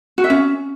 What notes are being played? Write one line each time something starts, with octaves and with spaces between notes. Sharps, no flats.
F#4
E5
C#4